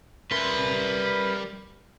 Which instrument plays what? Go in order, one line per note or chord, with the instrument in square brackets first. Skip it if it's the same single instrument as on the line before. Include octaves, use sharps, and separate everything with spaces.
[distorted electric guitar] G3 C6 [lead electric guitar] A#4 E5 [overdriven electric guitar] B4